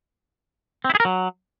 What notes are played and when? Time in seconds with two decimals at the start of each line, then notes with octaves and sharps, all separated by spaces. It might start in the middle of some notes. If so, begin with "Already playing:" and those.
0.85 C4
0.90 E4
0.95 G#4
1.00 A#4
1.05 F#3